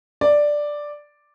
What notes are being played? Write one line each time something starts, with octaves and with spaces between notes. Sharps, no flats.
D5